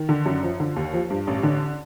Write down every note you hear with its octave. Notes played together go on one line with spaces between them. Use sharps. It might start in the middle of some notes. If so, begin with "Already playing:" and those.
Already playing: D#3
D3
F#2
F3
D3
D#2
F3
G2
A1
D3